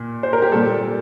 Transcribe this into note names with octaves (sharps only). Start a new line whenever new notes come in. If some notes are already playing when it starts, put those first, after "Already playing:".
Already playing: A#2
C5
A#4
G4
A#2 G3 A4